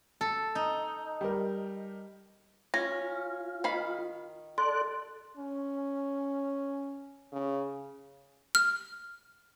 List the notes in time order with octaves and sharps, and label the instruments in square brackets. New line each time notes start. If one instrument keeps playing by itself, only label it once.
[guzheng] A4
D#4
[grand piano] G3 A#4
[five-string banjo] C#4 [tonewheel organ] F4 [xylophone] A#6
[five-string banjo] D#3 F5 B5
[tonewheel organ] A4 D5 F#6 [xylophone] C6
[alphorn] C#4
C#3
[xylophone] F6